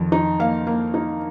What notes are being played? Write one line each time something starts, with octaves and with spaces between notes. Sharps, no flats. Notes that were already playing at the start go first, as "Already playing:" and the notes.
Already playing: F2 D#3
D#4
A#3 F5
A#3
D#4